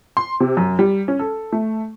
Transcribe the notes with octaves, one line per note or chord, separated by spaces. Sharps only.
C6
C3
F#2
G3
C#4
A4
A3